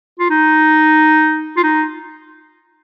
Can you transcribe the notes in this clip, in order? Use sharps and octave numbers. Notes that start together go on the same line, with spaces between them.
F4
D#4
F4
D#4